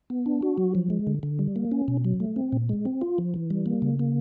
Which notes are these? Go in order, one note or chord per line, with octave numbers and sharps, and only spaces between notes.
B3
D4
F#4
F#3
F3
G#3
D3
D3
G3
A#3
C#4
B2
F#3
A3
C4
A#2
G#3
C4
F4
F3
E3
G3
A#3
C#3
A#3